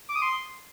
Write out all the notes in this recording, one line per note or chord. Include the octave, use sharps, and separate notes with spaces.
D6
D#6
C6